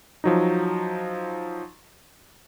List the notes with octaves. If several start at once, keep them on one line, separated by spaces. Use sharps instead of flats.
F3 F#3 D#4